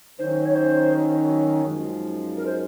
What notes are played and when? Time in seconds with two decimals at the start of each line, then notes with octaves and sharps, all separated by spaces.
0.19 D#3 F#3 C#4 C5
0.46 C#5
0.55 C5
1.64 F#2 F3 G#3 D#4
2.37 A#4
2.46 C5